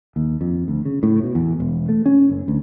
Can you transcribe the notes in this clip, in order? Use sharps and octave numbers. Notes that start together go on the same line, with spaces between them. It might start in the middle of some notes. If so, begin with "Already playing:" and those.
D#2
F2
D2
C#3
A2
B2
E2
E1
A3
C#4
F#1
D2